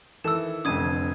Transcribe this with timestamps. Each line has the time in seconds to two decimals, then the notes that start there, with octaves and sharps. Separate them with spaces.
0.24 D#3 E3 A4 E6 E7
0.65 F1 F2 D3 D#6 G#6 D#7